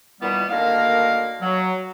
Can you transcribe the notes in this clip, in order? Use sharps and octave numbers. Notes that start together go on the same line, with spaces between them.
A#2 D#3 E3 G3 B3
D2 D3 D#3 A#3 A#4 F5
F#3